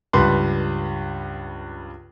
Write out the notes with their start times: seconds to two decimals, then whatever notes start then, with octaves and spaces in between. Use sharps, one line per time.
0.13 C#2 G2 B4 C6